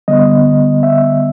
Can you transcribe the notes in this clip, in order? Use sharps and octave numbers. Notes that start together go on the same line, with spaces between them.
D3 G3 B3 D#5
E5